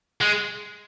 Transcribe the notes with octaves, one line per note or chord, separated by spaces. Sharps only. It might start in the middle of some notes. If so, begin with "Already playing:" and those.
G#3